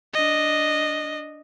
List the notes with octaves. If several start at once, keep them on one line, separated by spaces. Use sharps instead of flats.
D4 D#5